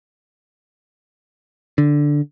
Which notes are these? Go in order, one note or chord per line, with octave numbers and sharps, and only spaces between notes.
D3